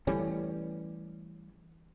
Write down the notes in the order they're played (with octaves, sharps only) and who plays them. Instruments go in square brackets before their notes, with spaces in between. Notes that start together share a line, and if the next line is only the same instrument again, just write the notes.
[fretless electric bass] E3 G3 A3 C#4